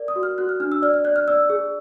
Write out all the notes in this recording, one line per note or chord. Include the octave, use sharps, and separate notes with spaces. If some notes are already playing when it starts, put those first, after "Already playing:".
Already playing: A#4 D5
D#6
F#4
F6
F#4 F#6
F6
D4 F6
E6
D5 F6
F6
D5 F#6
F6
D5 E6
G#4